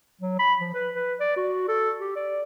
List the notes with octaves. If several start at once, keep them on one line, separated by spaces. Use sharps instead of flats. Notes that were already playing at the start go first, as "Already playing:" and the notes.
F#3
B5
F3
B4
B4
D5
F#4
A4
G4
D5